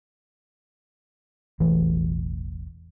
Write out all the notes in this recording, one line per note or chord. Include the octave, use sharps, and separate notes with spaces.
E1 A1 E3 A3